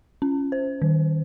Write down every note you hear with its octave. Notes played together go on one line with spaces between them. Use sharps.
C#4
C5
D#3